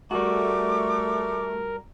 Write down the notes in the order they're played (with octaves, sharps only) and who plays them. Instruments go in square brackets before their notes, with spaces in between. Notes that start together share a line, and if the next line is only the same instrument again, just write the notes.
[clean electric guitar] G3 F#4 [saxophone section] A3 [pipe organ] A#4 [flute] D6